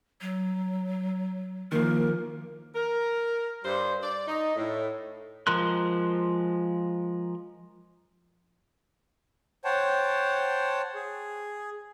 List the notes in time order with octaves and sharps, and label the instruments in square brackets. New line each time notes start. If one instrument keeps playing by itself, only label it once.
[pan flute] F#3
[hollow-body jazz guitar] D#3 F3 [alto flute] A#3 [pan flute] A#4
[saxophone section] A#4
G2 G3 C5
D5
D#4
A2
[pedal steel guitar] F3 G#3 A#4 C6 F#6
[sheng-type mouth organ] C5 C#5 F#5 G5 A5
G#4